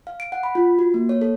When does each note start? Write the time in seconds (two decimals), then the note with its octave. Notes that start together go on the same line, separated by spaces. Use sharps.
0.07 F5
0.20 D7
0.32 F#5
0.43 B5
0.55 F4
0.79 F#4
0.94 A#3
1.09 C#5
1.21 A4